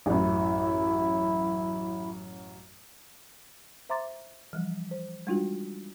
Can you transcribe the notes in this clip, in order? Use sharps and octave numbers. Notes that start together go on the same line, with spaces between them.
A1 F#2 E4
C5 E5 A#5 C6 D6 A6
E3 F3 G3
C5
G3 G#3 D4 D#4 F4 F#4